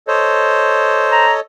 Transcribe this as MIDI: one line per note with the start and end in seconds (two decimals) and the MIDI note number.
0.08 1.40 69
0.08 1.26 72
0.08 1.40 73
0.08 1.40 75
1.12 1.33 82